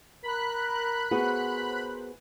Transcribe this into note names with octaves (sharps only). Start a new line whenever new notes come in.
A#4 B5 F#6
B3 F#4 G#4 A#4 C5